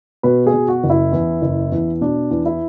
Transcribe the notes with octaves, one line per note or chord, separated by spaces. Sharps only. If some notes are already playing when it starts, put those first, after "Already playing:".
B2 B4
G#4
B2
F#4
F#1
E4
E2
F#1
E2
B2 D4
E2
E4